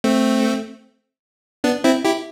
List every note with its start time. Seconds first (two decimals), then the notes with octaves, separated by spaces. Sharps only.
0.04 A3 C4
1.64 B3 D4
1.84 C4 E4
2.04 E4 G4